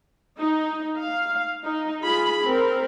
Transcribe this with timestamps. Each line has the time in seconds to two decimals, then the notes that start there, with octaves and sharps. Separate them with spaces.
0.39 D#4
0.98 F5
1.65 D#4
2.03 F4 G#4 B5
2.43 C4 A#4